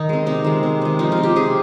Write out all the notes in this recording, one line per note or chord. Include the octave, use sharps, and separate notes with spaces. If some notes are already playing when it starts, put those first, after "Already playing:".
Already playing: D#3 D#4
G#3 C4
C3 D#4
D#3 G#3
C3
D#3 G#3
F3 D#4
F4
C4
G4
C3 G#4